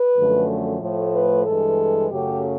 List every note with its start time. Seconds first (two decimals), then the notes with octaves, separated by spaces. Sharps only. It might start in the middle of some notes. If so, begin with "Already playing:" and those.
Already playing: B4
0.16 F#2 D3 F3 A3
0.81 A2 F3 A3
1.13 B4
1.46 G2 E3 G#3 A4
2.11 F#2 C#3 F#3 A3 G4